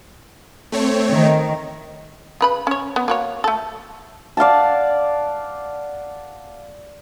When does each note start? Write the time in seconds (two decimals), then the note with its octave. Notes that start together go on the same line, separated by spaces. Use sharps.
0.72 A3 C4 C#5
1.12 D#3
2.41 C#3 B4 B5
2.67 C#4 C#5
2.96 B3
3.08 A#3 F#4 C#5
3.44 A3 A4
4.37 D5 F5 F#5 A5